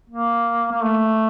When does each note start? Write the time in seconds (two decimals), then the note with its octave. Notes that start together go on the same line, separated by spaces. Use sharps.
0.10 A#3
0.72 A#3
0.82 A3